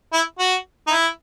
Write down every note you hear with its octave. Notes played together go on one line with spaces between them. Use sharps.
E4
F#4
D#4
E4